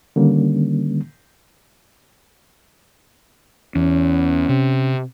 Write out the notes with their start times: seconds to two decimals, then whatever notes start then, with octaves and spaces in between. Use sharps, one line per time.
0.16 D3 D#3 G3 A#3 C#4
3.75 E2 C#4
4.49 C3